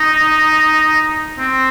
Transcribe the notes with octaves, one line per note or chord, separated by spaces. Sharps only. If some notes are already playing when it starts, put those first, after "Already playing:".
Already playing: D#4
C4